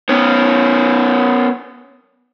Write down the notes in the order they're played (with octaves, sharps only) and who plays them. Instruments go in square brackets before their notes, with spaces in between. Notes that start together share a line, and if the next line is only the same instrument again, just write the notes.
[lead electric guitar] B3 C#4